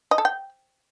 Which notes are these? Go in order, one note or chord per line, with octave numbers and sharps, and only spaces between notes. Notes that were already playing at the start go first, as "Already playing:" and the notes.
D#5
A4
G5